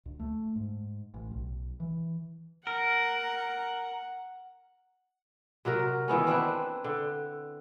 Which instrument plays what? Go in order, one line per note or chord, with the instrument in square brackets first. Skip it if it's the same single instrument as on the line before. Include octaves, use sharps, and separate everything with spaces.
[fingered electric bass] D2
A3
G#2
A1
B1
E3
[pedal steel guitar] A#4 [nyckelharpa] F#5
[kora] C3 F#3 F#4 A#4
D#3 E3 B3 C#4
C4 D4 E4 B4
D3